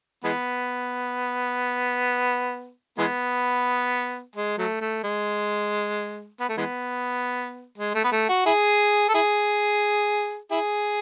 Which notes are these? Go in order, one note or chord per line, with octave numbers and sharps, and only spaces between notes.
E3 G#3 B3
E3 G#3 B3
G#3
F#3 A3
A3
G#3
B3
A3
E3 G#3 B3
G#3
A3
B3
A3
F#4
E4 G#4
A4
E4 G#4
E4 G#4